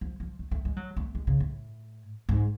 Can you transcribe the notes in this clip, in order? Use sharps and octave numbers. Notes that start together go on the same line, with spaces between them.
F3
F3
A3
A3
G#3
F#3
A3
G#3
C#3
A2
G#2